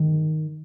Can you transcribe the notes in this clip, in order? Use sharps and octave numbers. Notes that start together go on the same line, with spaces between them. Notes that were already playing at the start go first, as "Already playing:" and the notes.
Already playing: G2 D3 D#3